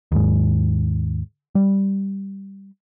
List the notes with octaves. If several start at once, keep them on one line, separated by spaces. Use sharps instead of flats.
D#2 G#2
G3